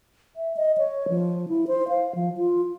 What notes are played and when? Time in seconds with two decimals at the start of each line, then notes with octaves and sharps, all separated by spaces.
0.36 E5
0.57 D#5
0.78 C#5
1.09 F3
1.48 E4
1.67 C5
1.88 F5
2.15 F3
2.38 F4